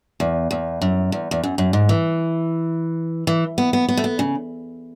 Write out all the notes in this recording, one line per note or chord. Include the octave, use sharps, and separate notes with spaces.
E2
E2
F#2
E2
E2
F#2
F#2
G#2
E3
E3
B3
B3
B3
A3
B3
C#3